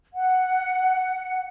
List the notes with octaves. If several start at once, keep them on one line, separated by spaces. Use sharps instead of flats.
F#5